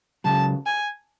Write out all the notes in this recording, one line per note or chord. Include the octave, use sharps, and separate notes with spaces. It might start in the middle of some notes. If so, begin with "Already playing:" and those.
C#2 C#3 F#3 A5
G#5